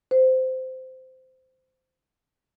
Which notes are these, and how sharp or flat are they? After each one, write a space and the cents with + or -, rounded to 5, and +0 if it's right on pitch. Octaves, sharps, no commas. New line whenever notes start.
C5 -15